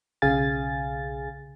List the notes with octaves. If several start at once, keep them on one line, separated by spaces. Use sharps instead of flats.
B1 C#3 G#4 F5 G#5 A6